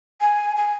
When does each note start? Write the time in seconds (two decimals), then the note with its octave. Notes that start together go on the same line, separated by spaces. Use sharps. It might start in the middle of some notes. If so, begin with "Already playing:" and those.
0.21 G#5
0.56 G#5